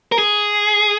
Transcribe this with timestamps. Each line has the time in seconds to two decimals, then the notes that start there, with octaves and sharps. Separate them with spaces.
0.12 A#4
0.18 G#4